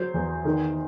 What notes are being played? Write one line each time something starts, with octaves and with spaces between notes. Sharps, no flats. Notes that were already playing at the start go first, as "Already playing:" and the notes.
Already playing: F#3 C5
E2
D#3